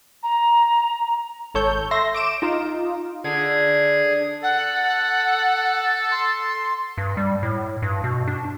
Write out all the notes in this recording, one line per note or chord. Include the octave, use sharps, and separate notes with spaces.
A#5
G#1 A4 C#5 G6
E5 C6 A#6
D6 D7 E7
D#4 F4
D3 G#4 G#6
A4 F#5
C6
G2
G3
A2
G2
B2
D4